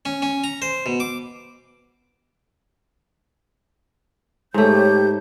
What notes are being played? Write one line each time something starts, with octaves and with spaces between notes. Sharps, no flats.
C#4
C#4
A#5
C5
B2
D6
G#2 A3 G4 C#5 G6